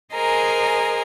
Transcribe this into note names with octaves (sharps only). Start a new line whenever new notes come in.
G#4 A#4 C5 D#5 G#5 A#5